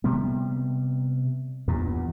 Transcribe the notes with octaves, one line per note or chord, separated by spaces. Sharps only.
C3 G3 B3
E2 G2 A#2